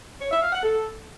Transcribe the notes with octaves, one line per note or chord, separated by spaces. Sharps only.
C#5
E5
F5
F#5
A4